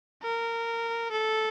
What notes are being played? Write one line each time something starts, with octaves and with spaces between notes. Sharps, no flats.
A#4
A4